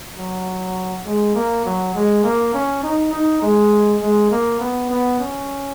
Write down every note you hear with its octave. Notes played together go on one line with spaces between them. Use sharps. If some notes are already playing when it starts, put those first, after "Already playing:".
F#3
G#3
A#3
F#3
G#3
A#3
C#4
D#4
D#4
G#3
G#3
A#3
B3
B3
C#4